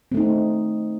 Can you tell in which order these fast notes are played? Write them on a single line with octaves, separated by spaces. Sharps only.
C4 A3 D#4